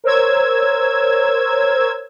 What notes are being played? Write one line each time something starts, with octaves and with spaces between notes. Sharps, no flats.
A#4 C5 C#5 E6 G#6